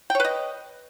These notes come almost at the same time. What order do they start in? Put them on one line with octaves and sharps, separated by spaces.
G5 C#5 B4 D#5